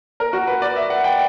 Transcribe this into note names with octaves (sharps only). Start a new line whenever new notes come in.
A#4
F#4
B4
D5
E5
F#5
G5